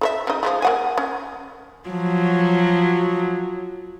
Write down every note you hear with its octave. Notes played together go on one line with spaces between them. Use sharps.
A4 A#4 E5
C#3 D#4
F3 G#3 A3
A#3 F#5 G#5
C#4
F3 F#3